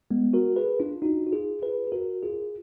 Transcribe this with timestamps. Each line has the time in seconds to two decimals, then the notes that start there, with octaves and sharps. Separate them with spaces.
0.11 G#3 B3
0.33 F#4 A#4
0.56 G#4 B4
0.80 D4 F4
1.02 D#4 F#4
1.27 F#4
1.32 F4 G#4
1.62 G#4 B4
1.87 G#4
1.92 F#4 A#4
2.23 F4 G#4